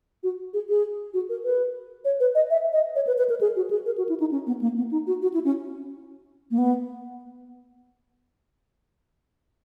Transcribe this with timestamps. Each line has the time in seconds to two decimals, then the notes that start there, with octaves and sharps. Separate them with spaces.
0.23 F#4
0.54 G#4
0.69 G#4
1.14 F#4
1.29 A#4
1.44 B4
2.05 C#5
2.20 B4
2.35 D#5
2.50 E5
2.73 D#5
2.95 C#5
3.07 B4
3.18 B4
3.29 A#4
3.41 G#4
3.56 F#4
3.71 G#4
3.86 A#4
3.98 F#4
4.09 E4
4.20 D#4
4.31 C#4
4.47 B3
4.61 A#3
4.77 B3
4.91 D#4
5.07 F#4
5.22 F#4
5.34 E4
5.45 C#4
6.51 A#3
6.58 B3